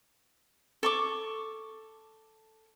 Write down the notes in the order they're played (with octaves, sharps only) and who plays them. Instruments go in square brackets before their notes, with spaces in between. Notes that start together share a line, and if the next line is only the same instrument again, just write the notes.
[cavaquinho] A4 C#6 D6